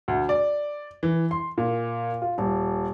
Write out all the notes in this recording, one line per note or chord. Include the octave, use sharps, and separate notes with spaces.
D2
D5
E3
C6
A#2
F4
D#1